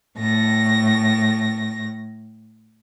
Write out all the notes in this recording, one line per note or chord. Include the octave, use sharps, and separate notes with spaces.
A2 A#6